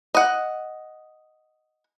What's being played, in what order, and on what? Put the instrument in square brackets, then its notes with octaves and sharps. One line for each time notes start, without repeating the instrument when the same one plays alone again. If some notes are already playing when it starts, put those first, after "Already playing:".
[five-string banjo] D#5 F#5